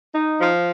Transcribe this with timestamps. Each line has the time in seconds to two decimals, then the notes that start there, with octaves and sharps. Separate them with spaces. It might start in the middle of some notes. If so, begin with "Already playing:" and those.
0.14 D#4
0.41 F3